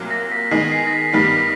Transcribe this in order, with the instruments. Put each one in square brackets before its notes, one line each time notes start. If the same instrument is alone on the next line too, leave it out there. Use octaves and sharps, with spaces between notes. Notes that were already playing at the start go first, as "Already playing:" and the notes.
Already playing: [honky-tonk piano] C2 A#2 F#3 A#3
[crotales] A#6
B6
[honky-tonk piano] D#3 G#3 B3 D#4 G#4 [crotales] C7
[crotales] C7
A#6
B6
[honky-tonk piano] G2 D#3 G3 B3 D#4 [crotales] B6